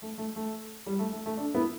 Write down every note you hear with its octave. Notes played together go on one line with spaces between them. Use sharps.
A3
A3
A3
G3
A3
A3
A3
A3 D4
B3 E4